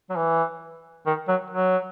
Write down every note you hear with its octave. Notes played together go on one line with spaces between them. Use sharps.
F#3
E3
D#3
F#3
F#3